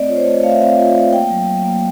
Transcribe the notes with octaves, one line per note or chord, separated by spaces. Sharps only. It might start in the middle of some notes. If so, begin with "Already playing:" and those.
Already playing: A3 C4 D5 D#5
F4 C#5
C5
C#5
A3
D#5
A3 F5
E5
C4 F5
F4
A3
A#3 G5
F#3
F#3
A#3